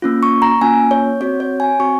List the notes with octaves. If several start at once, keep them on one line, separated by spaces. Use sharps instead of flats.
A#3 C#4 F4
C#6
A#5
A#3 C#4 F4 G#5
C#5
C4 F#4 C#5
C#5
G#5
C4 F#4 C#6